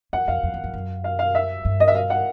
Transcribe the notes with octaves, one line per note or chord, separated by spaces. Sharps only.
E2 F#5
F2 F5
F2
E2
F2
F#2
F5
F5
E5
G2
D#5
E5
F5
F#5